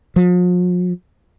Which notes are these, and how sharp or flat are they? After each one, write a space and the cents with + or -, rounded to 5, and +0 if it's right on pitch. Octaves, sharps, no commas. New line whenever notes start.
F3 +45